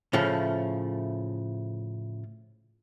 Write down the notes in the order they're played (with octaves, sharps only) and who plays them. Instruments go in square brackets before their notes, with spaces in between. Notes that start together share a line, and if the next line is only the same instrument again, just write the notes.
[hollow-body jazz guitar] A2 C#3 F3 A3